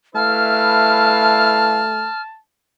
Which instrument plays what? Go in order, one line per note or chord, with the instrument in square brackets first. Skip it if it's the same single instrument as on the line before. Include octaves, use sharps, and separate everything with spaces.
[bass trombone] A3 [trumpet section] E4 B4 F5 [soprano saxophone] A5 [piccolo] F6